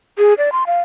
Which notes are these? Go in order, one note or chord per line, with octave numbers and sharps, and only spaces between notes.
G#4
D5
C6
F5